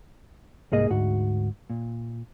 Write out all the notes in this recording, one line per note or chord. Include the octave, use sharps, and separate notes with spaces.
C2 G#2 A#3 G#4 D#5
D2 G#2 F#4
A#2